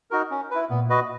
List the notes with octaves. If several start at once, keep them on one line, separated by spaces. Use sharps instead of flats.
D#4 F#4 A#4
C#4
E4 B4
A#2 B3
F#4 B4 D#5